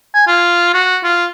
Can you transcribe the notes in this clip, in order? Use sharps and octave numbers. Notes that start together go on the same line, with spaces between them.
G#5
F4
F#4
F4